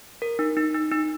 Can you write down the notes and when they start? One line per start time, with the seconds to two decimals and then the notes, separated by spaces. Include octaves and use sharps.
0.22 A#4
0.39 D#4
0.57 D#4
0.74 D#4
0.92 D#4